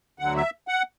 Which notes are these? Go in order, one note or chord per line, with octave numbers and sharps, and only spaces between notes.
D2 D3 F#3 F#5
E5
F#5